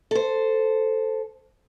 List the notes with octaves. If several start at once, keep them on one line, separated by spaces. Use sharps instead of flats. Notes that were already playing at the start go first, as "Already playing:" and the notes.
A4 C5